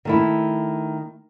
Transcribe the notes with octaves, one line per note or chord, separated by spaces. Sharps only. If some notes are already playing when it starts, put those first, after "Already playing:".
D#3 A3 E4